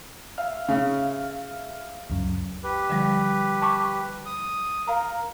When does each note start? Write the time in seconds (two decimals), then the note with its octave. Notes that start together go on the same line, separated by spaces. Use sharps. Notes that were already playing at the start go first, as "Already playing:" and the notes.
0.38 E5 F5 F6
0.68 C#3
2.10 C#2 F#2
2.63 G4 B4
2.90 D3 F3 G3
3.62 A5 C#6 D6
4.26 D#6
4.88 A#4 F5 A#5